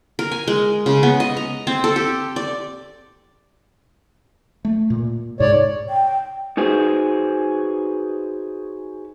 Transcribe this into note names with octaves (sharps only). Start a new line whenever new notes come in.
A#4
G#5
G#3
C#3
B3
D#5
A#5
C4
A4
G4
D5
A3
A#2
G#2 C3 C#5 D5
G5
D#4 F#4 G#4 B4 C5